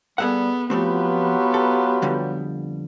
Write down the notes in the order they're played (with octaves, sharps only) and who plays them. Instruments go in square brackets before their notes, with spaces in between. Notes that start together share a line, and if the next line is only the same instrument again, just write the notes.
[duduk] G3 [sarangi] B3 [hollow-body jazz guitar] G#4 A4 F#5
[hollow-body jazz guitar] F3 A3 C4 [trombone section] F#3 F4 B4 [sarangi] B3 [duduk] G4
[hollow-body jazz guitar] A4
F2 D3 G3